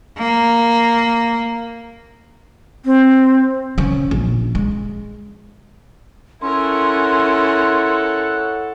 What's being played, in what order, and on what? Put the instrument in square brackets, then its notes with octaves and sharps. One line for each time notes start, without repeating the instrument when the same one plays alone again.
[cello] A#3
[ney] C4
[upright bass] C#3 C#4
A#1
G#3
[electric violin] C#4 A#4 [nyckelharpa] E4 [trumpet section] A4 C#5 F#5 [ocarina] C6